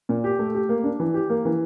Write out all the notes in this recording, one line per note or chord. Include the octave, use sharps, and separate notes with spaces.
A#2
G4
A3
G4
A#3
D4
E3
G4
A#3
E3